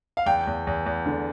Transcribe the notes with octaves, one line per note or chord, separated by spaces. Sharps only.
F5
E2 G5
E2
E2
E2
D3